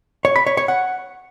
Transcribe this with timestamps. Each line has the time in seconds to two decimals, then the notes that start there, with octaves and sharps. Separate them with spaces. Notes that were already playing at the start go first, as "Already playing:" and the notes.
0.25 C#5
0.36 B5
0.47 C#5
0.57 C#5
0.68 F#5